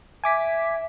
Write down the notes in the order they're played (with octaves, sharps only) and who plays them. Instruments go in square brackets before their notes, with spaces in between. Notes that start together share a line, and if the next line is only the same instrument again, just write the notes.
[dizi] E5 [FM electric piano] G#5 D6 B6